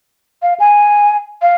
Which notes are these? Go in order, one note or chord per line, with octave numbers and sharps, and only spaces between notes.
F5
G#5
F5